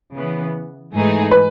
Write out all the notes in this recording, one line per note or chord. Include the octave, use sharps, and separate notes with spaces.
C#3 E3 B3
G#2 E3 A3 D#4 G#4
B4